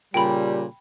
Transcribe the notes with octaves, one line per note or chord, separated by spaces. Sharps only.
A#2 C#3 G3 G5 B5